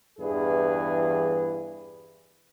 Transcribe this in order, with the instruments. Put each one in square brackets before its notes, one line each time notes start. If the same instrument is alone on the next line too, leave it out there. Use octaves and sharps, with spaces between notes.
[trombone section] E2 G2 E3 E4 G#4 B4